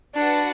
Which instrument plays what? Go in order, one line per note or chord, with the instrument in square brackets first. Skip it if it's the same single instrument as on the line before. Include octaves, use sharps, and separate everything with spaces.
[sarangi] D4 [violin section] F#4 B4 F#5 A5